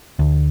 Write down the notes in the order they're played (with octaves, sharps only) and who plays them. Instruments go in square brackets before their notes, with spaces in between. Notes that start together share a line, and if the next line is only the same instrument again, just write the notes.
[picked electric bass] D2